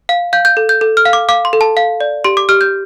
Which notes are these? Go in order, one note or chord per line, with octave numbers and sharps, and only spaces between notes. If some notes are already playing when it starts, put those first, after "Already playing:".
F5
F5 G6
G6
A4
G6
A4
F6
F5
D6
F5 D6
C6
A4
A5
F5
D5
G4 C6
D6
G4 F6
G6